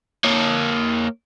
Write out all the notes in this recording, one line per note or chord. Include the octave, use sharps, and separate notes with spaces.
A#3 C#5